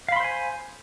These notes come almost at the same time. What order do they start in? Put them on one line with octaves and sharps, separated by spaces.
F5 B5 C6 C5 G#5